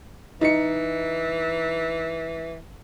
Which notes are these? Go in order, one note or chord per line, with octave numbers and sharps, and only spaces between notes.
E3 D#4 C#7